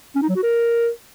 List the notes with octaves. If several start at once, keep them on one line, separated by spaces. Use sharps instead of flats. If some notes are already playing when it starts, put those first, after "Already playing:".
C#4
D#4
F#3
F#4
A#4